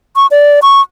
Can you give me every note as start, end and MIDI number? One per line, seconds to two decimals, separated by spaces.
0.16 0.27 85
0.31 0.59 74
0.62 0.81 85